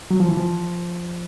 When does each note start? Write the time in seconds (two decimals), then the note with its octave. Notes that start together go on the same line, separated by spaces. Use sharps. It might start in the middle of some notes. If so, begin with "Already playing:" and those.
0.11 F#3
0.20 F3
0.29 E3
0.37 F3